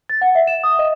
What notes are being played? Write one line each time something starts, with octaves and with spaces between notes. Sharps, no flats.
A6
F#5
E5
E7
D#6
D#5